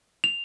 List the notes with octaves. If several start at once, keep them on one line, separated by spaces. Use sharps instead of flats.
F7